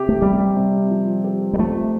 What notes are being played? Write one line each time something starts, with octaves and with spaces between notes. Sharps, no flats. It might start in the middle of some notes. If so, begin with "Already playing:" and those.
Already playing: C3 G4
A3
G3 G4
C3
F3
G4
G3
F3 A3